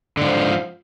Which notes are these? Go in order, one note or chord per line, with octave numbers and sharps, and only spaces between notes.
G#2 D3 F3